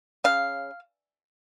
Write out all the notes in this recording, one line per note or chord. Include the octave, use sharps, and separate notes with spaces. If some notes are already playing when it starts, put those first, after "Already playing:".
C#3 F5